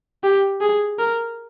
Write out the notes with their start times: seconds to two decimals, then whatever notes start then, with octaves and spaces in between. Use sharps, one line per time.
0.23 G4
0.61 G#4
0.99 A#4